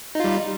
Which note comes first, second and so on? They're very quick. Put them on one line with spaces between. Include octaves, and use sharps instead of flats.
D#4 F4 G3